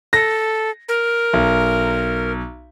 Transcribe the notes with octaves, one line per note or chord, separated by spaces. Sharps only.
A4 A#6
A#4
B1